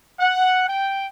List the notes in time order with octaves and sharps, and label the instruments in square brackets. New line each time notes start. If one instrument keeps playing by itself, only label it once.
[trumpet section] F#5
G5